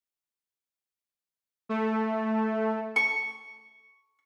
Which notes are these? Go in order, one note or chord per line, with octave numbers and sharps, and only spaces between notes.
A3
C#6